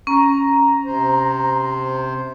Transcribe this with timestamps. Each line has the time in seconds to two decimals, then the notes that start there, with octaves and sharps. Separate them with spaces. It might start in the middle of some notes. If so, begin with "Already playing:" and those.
0.07 C#4 A#5
0.85 C3 C5